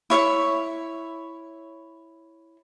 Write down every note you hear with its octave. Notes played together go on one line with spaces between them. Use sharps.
E4 C#5 E5 C#6